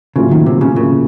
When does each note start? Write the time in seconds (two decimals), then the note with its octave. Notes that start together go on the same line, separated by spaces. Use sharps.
0.16 A2 C#3 F#3 A#3 F4
0.31 D#3
0.46 C3
0.61 C#3
0.76 A2 C#3 F#3 A#3 F4